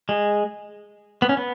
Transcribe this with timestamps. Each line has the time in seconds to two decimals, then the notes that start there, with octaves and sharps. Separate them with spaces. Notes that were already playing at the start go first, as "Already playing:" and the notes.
0.09 G#3
1.22 B3
1.29 C#4
1.37 B3